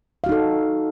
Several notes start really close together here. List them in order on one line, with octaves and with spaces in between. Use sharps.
F5 F#4 D#4 A4